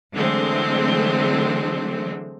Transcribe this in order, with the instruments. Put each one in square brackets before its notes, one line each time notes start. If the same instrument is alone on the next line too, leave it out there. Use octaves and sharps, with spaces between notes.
[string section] D3 E3 F#3 G#3 A3 C4